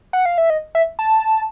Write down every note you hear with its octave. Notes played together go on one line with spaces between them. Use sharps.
F#5
F5
E5
D#5
E5
A5